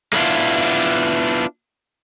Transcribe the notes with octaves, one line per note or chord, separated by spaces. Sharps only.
G#3 A#3 B3 D4 E4 F4